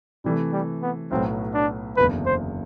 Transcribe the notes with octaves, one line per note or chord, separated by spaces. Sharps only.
C3 E3 G3 A3
G3
B3
B1 A2 F#3 B3 C4
D4
F#1 E2 D3 B4
C5